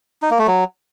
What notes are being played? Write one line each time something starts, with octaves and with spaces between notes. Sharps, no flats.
D#4
A#3
A3
F#3